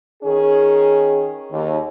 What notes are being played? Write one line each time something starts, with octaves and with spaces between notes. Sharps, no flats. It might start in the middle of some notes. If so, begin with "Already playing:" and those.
D#3 C#4 G#4
D#2